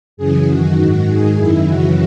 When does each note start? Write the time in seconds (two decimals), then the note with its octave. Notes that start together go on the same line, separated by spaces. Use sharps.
0.17 F#2 C#3 E3 G#4
0.47 F#2 D#3 F#4
0.77 G#2 D#3 F#4
1.07 G#2 D#3 G#4
1.37 F#2 D#3 E4
1.67 F#2 C#3 E3 F#4